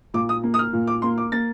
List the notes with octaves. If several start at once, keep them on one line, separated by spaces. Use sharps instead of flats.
A#2 D6
D#6
A#3
D#6
F6
A#2
D6
A#3 C6
D6
A#3 A6